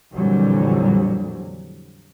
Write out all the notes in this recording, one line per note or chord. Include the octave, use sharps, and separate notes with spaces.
F2 A#2 D3 E3 F#3 G3